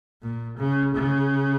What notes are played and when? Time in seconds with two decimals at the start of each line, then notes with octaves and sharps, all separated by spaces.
0.22 A#2
0.57 C#3
0.94 C#3